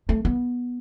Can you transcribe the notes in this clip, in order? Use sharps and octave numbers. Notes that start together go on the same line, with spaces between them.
A3
B3